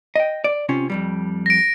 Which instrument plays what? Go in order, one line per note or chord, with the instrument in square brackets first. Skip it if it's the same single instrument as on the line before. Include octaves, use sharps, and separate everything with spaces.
[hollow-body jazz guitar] D#5 G5
D5
C3 C#4 F4
F2 A#2 G3
[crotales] A#6 D7